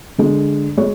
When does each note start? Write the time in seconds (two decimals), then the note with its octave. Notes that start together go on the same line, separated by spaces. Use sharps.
0.18 D3 G#3
0.77 G#3 C#5